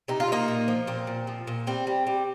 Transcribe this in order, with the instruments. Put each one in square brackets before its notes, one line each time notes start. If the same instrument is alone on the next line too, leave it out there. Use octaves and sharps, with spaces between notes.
[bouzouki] C3 D#4
F4
C3 A#3 D#4
A#2
F3
A#2 C4
A#2
F3
A#2
G3 C4
G3
G3